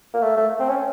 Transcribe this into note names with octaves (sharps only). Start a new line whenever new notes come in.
A#3
A3
A3
C4
C#4